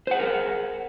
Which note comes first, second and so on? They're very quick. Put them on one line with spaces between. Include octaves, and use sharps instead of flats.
C5 F#5 G#4 A#4